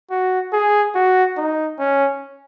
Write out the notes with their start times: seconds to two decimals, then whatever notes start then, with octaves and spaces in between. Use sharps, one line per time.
0.11 F#4
0.53 G#4
0.95 F#4
1.37 D#4
1.79 C#4